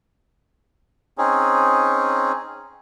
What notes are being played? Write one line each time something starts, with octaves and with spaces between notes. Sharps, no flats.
C4 C#4 D#4 G#4